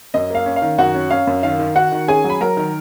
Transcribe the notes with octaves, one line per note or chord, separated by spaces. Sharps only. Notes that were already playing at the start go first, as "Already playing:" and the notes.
F#2 D#5
A#3 F5
C#4
F5
D#3
F#2 F#4 F#5
C#4
C#4 F5
F#2
D#3 F5
D#3
D#3 F#4 F#5
D#3
C#4 G#4 G#5
F#3
B5
F#3 A#4 A#5
D#3